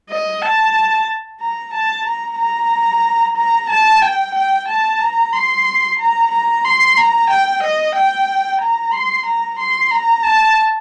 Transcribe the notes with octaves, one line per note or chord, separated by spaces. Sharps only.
D#5
A5
A#5
A5
A#5
A#5
A#5
A5
G5
G5
A5
A#5
C6
A#5
A#5
C6
A#5
G5
D#5
G5
A#5
C6
A#5
C6
A#5
A5